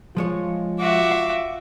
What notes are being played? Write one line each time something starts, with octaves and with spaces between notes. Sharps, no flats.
F3 G#3 F4 C#5
F#4 E5 D6
F5